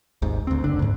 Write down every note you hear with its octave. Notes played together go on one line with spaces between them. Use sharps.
G#1 D#2 G#2
D2 C4
F#1 D3 D4
D2 G#2